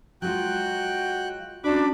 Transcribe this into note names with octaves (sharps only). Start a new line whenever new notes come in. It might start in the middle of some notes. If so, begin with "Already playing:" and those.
F#3 G#3 F4 F#4 G5 F#6
C#4 D4 F#4 B5 D6